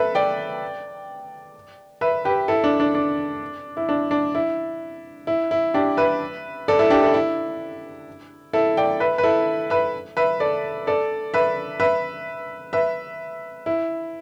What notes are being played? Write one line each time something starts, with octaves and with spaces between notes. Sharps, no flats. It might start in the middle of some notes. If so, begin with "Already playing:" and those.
Already playing: A4 B4 E5
D5 G5
B4 E5
G4 B4
E4 A4
D4
D4
D4
E4
D4
D4
E4
E4
E4
D4 G4
B4 E5
A4 D5
E4 A4
D4 G4
E4 A4
E4
E4 A4
D5 G5
B4 E5
B4
E4 A4
B4 E5
B4 E5
A4 D5
A4 D5
B4 E5
B4 E5
B4 E5
E4